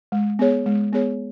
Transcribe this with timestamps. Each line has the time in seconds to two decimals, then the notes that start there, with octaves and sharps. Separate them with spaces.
0.12 G#3
0.39 B3 G#4 C#5
0.66 G#3
0.93 B3 G#4 C#5